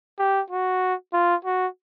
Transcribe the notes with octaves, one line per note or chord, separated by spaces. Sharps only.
G4
F#4
F4
F#4